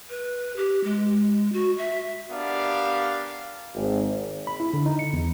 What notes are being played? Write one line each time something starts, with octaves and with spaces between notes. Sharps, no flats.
B4
G4
G#3
F#4
E5
B3 D4 G4 A#4 D5 F5
G#1
B5
E4
D3
D#4
C#7
E2